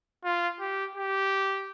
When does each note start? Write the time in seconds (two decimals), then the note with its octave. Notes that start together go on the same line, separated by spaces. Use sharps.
0.24 F4
0.60 G4
0.95 G4